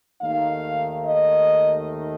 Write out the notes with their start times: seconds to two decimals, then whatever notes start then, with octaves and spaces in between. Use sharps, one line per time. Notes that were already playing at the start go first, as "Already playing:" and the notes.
0.22 D#2 D#3 A3 D#4 F5
1.05 D#5